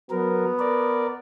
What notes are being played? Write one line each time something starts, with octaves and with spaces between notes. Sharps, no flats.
F#3 B3 A#4
A#4 D5